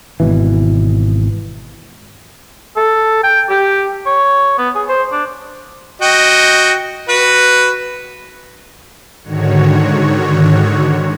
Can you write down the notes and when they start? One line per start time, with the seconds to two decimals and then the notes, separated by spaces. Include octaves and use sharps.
0.20 G#1 B2 E3
2.77 A4
3.24 G5
3.50 G4
4.06 C#5
4.58 B3
4.75 G#4
4.89 C5
5.12 D4
6.02 F#4 D#5 G5
7.09 F#4 B4
9.24 G#2 D3 D#3 F#4 C#5